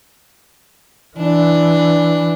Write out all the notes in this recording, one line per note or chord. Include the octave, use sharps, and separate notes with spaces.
E3 D4